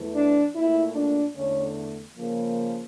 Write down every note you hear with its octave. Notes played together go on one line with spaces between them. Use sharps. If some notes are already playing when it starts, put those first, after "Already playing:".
Already playing: E2 E3 A3
D4
A#2 A3 E4
D4
E2 D3 A3 C#4
C#3 F3 A#3